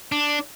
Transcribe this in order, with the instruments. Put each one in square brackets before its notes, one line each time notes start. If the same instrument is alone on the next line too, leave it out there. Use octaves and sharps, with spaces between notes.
[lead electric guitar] D4